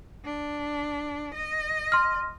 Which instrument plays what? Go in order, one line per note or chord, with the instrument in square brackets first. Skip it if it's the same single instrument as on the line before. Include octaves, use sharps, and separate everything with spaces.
[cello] D4
D#5
[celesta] C6 F6